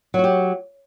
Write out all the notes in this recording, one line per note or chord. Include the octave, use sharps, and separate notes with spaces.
F#3 F#4 G4